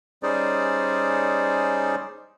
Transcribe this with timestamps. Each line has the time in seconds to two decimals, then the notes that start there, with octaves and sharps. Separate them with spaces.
0.23 G3 C#4 D#4 G#4 C5 D5